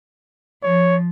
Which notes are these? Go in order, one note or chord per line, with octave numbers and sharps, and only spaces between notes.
F3 C#5